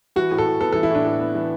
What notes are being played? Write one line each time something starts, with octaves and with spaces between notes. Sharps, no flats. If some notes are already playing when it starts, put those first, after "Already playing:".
E3 F#4
A2
A4
A2
B3 A4
A4
E3
E4
A2 D4
A2
B3
E3